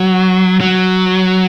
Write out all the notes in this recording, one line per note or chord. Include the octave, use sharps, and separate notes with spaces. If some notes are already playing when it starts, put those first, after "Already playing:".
Already playing: F#3
F#3